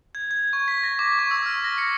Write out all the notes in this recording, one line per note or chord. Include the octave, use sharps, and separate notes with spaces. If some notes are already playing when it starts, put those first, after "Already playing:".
G#6
G#6
C#6
B6
A#6
D6
C#6
E6
F6
A#6
C#7